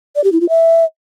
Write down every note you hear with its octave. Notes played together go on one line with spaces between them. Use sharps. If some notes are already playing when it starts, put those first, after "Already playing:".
D5
G4
E4
F4
E5